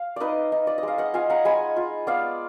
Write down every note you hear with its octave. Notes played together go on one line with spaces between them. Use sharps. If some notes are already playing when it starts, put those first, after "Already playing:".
Already playing: F5
D#4 B4 D5 D#5
D#4
D5
D#5
G#3 F5
D#5 F#5
F4 F5 G#5
F#5 A#5
G#3 G#5 B5
F4
B3 D5 F5